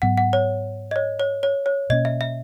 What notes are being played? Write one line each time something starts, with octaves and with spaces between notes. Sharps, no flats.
G#2 F#3 B3 F#5
F#5
C#5
D#5
C#5
C#5
C#5
C#5
B2 A#3 C#4 D#5
E5
E5